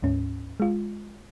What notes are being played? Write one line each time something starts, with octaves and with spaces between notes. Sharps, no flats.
D2 G#2 C#4
G#3 F4